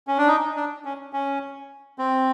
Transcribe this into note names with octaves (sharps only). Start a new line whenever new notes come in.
C#4
D4
D#4
D4
C#4
C#4
C4